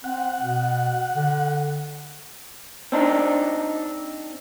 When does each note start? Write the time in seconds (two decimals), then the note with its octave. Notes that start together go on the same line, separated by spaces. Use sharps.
0.04 C4 F#5
0.39 B2
1.16 D3
2.92 C4 D4 D#4